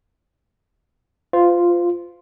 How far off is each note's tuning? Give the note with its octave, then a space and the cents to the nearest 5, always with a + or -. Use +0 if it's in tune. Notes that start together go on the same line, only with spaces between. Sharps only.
F4 +0 C5 -30